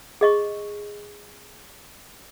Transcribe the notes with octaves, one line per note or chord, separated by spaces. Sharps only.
G#4 D#5 C#6